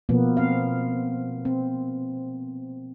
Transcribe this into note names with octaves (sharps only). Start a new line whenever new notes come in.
B2 F3 A#3 B3
C4 F5
C4